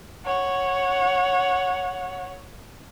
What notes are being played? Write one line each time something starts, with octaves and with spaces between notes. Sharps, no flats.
C#5 F#5